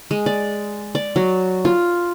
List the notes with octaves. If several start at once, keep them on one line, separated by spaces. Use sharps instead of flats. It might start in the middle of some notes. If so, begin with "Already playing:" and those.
G#3
D5
D5
F#3
F4